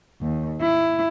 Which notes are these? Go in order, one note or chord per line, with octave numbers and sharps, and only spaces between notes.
D#2
E4